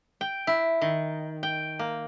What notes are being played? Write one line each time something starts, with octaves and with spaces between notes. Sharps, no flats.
G5
E4
D#3
G5
A#3